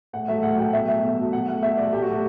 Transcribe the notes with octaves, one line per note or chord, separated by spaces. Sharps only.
A2 F#5
F#3 A3 E5
A2 F#5
F#3 A3 G5
B2 E5
F#3 A3 E5
B2
F#3 A3
B2 F#5
A3 F#5
B2 E5
A3 D5
A2 G4
F#4
F#3 A3 G4